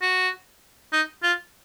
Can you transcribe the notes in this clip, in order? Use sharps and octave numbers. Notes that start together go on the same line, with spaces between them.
F#4
D#4
F4